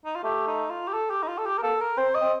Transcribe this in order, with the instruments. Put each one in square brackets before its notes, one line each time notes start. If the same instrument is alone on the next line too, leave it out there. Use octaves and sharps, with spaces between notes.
[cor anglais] D#4
F4
[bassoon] A3 [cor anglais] G4
[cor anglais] D#4
F4
G4
A4
G4
D#4
F4
A4
G4
A#4
[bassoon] A#3 [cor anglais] A4
[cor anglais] A#4
[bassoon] C4 [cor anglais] C5
[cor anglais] D#5
[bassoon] C4